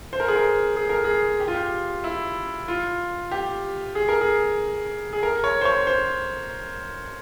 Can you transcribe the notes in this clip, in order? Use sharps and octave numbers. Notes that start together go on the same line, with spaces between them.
C5
A#4
G#4
A#4
G#4
A#4
G#4
G4
F4
G4
E4
F4
G4
G#4
A#4
G#4
G#4
A#4
C#5
C5
C#5
C5